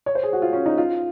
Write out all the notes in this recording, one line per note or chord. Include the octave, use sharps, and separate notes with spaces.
C#5
C5
G#4
F#4
F4
C#4
D#4
F4